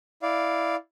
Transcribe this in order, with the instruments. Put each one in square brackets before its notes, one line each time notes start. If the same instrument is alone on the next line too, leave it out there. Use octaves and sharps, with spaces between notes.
[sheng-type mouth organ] E4 D5 F5